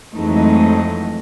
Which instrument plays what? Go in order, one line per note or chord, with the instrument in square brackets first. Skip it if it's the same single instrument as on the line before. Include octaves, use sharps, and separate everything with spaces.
[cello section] F2 E3 F#3 G#3 A3 D#4